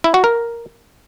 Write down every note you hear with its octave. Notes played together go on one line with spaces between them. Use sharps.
E4
F#4
A#4